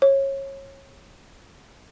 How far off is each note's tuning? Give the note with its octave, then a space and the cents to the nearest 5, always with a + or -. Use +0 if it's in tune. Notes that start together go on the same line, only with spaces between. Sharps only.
C#5 -25